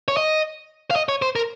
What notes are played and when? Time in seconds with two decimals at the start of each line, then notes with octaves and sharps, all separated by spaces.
0.08 C#5
0.17 D#5
0.91 F5
0.96 D#5
1.09 C#5
1.22 C5
1.36 A#4